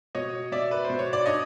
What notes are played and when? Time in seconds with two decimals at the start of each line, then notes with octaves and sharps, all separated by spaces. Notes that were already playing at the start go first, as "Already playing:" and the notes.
0.15 B2 C#5 D#5
0.52 B2 D5 E5
0.71 B4
0.85 B2 C5
0.99 C#5
1.13 D5
1.26 D4 C#5 D#5